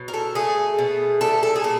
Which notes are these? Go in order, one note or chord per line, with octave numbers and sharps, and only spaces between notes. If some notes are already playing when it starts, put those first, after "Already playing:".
Already playing: B2 F#3
A#4
A4
A3 G#4
B2
G3 A4
A4
G#4
A#2 A4